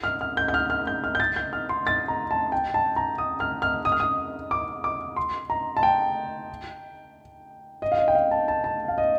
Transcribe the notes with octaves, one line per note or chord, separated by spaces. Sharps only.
F6
F6
G6
G6
F6
F6
G6
F6
G6
A6
G6
F6
C6
A6
A#5
A5
G5
A5
A#5
D#6
F6
F6
D#6
F6
D#6
D6
D6
C6
A#5
A5
G5
D#5
F5
D#5
G5
F5
A5
A5
A5
F5
D#5